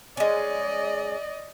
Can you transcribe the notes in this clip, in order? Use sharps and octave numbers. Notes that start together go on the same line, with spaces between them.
G#3 C#4 D5 D#5